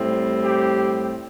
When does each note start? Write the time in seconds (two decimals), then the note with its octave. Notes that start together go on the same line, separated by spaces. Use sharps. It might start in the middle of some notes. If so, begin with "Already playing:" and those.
Already playing: A2 G3 C4
0.44 G4